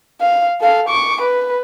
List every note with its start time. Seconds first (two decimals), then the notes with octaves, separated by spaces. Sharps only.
0.21 F5
0.61 A4 F5
0.89 C#6 D6
1.21 B4